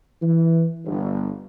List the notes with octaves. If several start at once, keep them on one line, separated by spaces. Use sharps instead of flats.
E3
G1